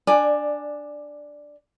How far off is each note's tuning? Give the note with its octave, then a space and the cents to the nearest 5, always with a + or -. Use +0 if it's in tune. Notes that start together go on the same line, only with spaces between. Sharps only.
D4 +0 D5 +15 G#5 +0